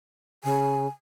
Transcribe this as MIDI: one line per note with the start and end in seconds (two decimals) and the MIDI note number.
0.44 0.87 49
0.44 0.86 80